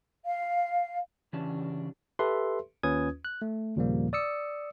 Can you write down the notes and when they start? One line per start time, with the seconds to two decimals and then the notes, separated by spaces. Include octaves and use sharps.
0.25 F5
1.33 C#3 E3 C#4 D4 G4 A5
2.19 G4 A4 B4 E5 C6
2.83 D#2 C#4 F4 B4 D#6 G#6
3.25 F#6
3.42 A3
3.76 D#2 A#2 C#3 F3 G3 A#3
4.13 D5 D#6 E6 C#7